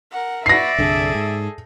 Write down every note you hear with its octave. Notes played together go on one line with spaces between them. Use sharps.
A#4 F#5
F#4 B4 D5 E5 A#6 C7
C2 G2 D3 G#4 A4
G#2